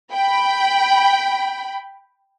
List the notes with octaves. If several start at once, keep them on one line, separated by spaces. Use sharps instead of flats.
G5 B5